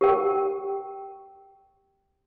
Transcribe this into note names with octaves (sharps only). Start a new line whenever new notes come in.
G4 A#4 G5